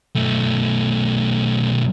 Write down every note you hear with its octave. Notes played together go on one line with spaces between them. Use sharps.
B1 A3